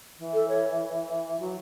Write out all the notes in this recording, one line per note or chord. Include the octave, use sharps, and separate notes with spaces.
E3
A4
C#5
F#3